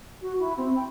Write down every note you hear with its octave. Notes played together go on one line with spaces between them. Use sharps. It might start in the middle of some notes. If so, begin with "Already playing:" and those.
F#4
E4
C4
G5